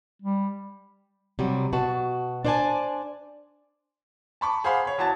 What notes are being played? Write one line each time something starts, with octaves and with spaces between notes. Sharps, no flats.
G3
C3 F#3 G3
B2 F#4 A5
D4 C5 D5 F#5 G#5 A5
A5 B5 C#6 D6
G#4 C5 F5 F#5 B5
C#5 B5
E2 F#4 C#5 A5 A6